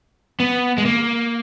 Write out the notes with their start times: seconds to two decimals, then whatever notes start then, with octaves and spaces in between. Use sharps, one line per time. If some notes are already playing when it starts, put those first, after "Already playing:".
0.40 B3
0.78 G#3
0.85 A#3